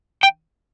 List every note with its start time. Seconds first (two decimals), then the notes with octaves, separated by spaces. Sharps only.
0.23 G5